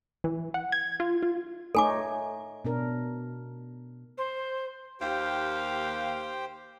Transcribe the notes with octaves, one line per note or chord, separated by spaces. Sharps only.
E3
F#5
G#6
F4
F4
A3 D#4 A4 C#5 G#5 D6
B2 D4 A#4
C5
D#2 G4 C5 F5 G5